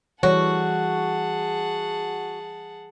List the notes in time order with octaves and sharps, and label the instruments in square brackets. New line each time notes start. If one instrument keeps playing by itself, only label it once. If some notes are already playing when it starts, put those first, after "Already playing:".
[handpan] E3 G3 A4 [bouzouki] F#4 [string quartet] G#4 F#5 A5 [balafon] C#5